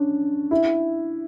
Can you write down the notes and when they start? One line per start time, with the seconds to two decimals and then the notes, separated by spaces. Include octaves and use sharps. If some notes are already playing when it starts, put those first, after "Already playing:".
Already playing: C#4 D4
0.51 E4